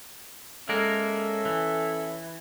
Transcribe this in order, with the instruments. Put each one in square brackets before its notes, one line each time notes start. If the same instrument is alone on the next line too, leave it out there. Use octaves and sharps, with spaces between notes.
[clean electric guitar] G#3 A#3 A#4 [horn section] C#4 A4 E5
[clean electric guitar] E3